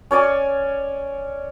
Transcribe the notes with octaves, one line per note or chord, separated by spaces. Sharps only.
C#4 C#5 D5 G#5